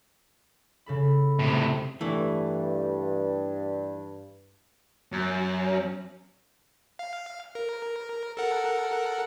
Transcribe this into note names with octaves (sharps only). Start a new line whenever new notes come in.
C#3 A4 B5
A2 C3
G2 E3 A3
F#2
F5
A#4
A4 A#4 F#5